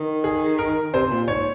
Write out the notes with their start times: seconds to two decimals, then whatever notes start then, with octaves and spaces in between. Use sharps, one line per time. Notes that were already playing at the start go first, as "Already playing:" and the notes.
Already playing: D#3
0.24 G#4
0.59 A#4
0.94 C3 C5
1.06 C3
1.11 A#2
1.28 G#2 C#5